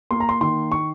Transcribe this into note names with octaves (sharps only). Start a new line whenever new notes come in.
A#3 C6
A#5
C6
D#3 C6
C#6